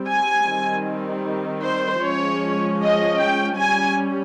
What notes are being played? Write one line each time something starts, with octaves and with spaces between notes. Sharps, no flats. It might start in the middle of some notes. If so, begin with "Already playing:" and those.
Already playing: G3 C4
G#5
D#3 G3 C4
C5
F3 G#3 C#4 C#5
D#5
G5
G3 C#4 G#5